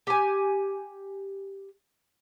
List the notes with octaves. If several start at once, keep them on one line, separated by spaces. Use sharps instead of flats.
G4 G#5